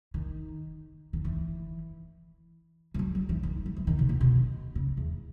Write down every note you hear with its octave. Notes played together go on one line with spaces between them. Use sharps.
D#3
D#3
E3
E3
F#3
F#3
E3
D#3
F#3
E3
D#3
B2
A#2
B2
C#3
E2